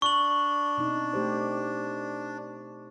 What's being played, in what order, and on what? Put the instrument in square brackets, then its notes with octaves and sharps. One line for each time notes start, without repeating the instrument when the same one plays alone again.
[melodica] D4 [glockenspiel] C#6 F#7
[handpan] B2 C4 D#4
A3 G4 C5